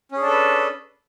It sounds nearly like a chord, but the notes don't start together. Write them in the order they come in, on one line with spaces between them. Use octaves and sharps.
C#4 G#4 D4 A4 B4